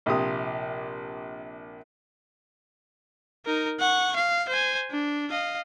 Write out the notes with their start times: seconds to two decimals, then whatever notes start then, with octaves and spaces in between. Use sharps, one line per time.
0.06 A#1 C3 G4 D#6
3.46 D#4 A#4
3.80 F#5 C#6
4.16 F5
4.49 C5 G#5
4.90 D4
5.30 D#5 F5